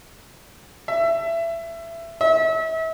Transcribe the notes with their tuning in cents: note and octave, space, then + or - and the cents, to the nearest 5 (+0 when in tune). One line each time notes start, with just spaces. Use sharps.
E5 +20
E5 -35